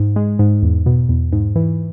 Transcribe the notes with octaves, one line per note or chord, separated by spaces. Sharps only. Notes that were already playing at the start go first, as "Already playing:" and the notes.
Already playing: G#2
G#3
G#2
E2
B2
E2
G#2
E3